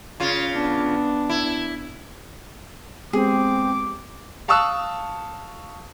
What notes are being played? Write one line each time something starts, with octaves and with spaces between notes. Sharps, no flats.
C#3 F4
B3 D4
E4
G#3 B3 C4 G4 G#4 D6
F5 A5 C#6 D#6 E6 F#6